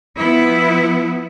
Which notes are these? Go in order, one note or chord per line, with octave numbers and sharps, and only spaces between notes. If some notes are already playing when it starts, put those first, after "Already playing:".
F3 B3 E4